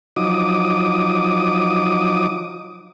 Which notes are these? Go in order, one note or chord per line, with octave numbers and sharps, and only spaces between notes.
F3 F#3 D#4 D6 D#6